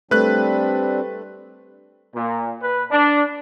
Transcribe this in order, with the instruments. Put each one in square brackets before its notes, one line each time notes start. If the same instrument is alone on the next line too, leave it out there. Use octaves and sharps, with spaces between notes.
[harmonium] G3 C4 D4 [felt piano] A3 A4 [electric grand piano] B4 F#6
[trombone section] A#2
B4
D4